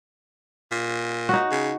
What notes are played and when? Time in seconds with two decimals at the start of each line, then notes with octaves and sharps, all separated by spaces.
0.71 A#2
1.29 D#4 F#4
1.51 C#3